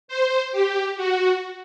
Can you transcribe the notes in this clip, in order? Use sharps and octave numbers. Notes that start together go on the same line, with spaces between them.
C5
G4
F#4